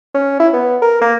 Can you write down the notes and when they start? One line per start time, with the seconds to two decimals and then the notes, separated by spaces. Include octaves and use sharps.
0.14 C#4
0.40 E4
0.53 B3
0.82 A#4
1.01 A#3